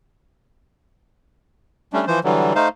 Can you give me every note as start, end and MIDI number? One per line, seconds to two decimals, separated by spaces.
1.93 2.05 55
1.93 2.05 57
1.93 2.05 61
1.93 2.05 62
2.07 2.20 52
2.07 2.20 53
2.07 2.20 72
2.24 2.53 50
2.24 2.53 52
2.24 2.53 54
2.24 2.53 55
2.55 2.68 57
2.55 2.68 63
2.55 2.68 72
2.55 2.68 77